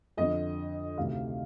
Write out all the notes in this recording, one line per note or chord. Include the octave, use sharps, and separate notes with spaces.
F2 D3 D#5
D2 C3 D#3 F5